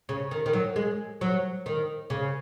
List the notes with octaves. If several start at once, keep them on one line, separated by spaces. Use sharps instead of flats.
C#3
D#3
D#3
F#3
G#3
F#3
D#3
C#3